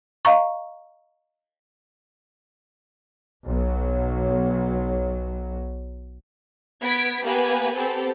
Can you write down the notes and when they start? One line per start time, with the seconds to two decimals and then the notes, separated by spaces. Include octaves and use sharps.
0.25 D#5 F5 A#5 C#6
3.46 B1 F#3
6.81 B3 G#6 B6 D7
7.24 A#3 B3 G4 B4 G#5
7.75 B3 C4 G4 A4